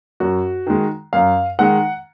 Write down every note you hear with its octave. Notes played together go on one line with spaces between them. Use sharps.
F#2 F#4
D#3 G#3
F#2 F5
D#3 G#3 F#5